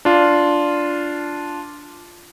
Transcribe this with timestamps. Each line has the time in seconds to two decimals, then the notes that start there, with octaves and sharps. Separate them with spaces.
0.05 D4 F4